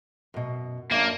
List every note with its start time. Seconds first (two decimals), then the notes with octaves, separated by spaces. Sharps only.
0.34 F#2 B2
0.91 F#2 A#3 D4